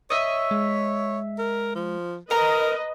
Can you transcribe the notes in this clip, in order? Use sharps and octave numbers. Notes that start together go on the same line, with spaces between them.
C#5 D#5 E5
G#3
A#4
F3
A#4 B4 D#5 A#5